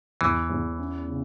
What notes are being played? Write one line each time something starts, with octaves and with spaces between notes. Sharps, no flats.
E2 E3
E2
C#4
C#3